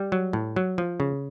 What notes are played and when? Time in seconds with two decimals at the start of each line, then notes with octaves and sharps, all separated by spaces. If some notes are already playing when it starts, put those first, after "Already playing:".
Already playing: G3
0.12 F#3
0.33 A2
0.56 F#3
0.78 F3
1.00 C#3